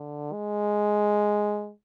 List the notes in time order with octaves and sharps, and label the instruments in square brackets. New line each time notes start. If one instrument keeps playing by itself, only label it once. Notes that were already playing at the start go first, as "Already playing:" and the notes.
Already playing: [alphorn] D3
G#3